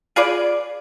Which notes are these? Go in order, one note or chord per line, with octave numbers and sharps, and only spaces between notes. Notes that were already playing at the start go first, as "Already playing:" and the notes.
F4 G#4 B4 D5